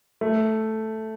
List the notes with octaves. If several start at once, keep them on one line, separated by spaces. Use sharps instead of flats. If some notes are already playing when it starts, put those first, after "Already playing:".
A3